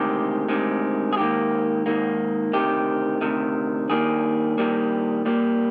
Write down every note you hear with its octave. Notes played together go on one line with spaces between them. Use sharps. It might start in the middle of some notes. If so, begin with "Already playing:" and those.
Already playing: D2 C3 D#3 G#3 G4
D2 C3 D#3 G#3
G#4
G#2 D#3 A#3 G4
G#2 D#3 A#3
D2 C3 D#3 G4
D2 C3 D#3
G2 D#3 G3 A#3 G#4
G2 D#3 G3 A#3
A#2 G3 A#3